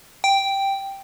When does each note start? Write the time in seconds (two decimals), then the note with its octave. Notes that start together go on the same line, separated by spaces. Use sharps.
0.24 G5